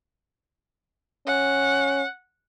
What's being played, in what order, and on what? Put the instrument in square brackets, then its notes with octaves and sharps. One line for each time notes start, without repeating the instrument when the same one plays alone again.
[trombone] C#4 [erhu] F#5